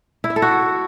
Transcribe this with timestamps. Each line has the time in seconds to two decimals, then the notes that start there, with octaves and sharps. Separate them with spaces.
0.24 E4
0.30 E5
0.36 A4
0.42 F#4